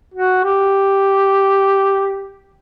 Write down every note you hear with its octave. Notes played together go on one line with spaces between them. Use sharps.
F#4
G4